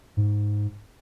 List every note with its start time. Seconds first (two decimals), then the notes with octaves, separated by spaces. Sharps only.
0.17 G#2